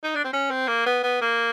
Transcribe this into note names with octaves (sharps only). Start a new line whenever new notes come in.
D#4
D4
C4
C#4
C4
A#3
B3
B3
A#3